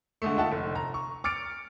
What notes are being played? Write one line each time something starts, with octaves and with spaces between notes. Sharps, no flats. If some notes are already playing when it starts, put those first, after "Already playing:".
D3 G#3 A3
D#4 F4 E5 F#5 A5
F1
A#5
C#6
D6 F6 A6 C#7 D7